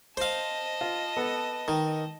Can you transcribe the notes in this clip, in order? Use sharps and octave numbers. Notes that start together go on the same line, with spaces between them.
C5 D#5 F5 A5
F4
B3 A4
D#3